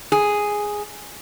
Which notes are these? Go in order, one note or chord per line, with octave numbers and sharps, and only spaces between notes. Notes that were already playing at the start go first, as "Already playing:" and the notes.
G#4